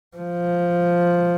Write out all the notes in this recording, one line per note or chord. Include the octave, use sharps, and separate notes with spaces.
F3